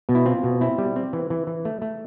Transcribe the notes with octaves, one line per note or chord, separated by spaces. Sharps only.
B2
E4
C4 F4
B2
C4 E4
G3
C4
E3
E3
E3
A3
A3